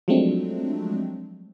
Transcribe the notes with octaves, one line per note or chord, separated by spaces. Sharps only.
F3 F#3 G#3 A3 C4 D4